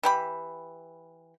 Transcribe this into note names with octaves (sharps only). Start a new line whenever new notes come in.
E3 G4 B5